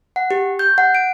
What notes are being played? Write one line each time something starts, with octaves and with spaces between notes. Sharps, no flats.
F#5
G4
G6
F#5
D7